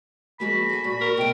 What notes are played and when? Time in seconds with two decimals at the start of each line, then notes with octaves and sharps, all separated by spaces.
0.40 F3 G#3 A#3 F#4 B5
0.69 A4 G#5
0.84 A#2
1.01 A#4
1.17 B2 A3 G5